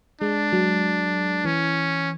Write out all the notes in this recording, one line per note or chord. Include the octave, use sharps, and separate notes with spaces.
G#3 D4
F#3
E3 C#4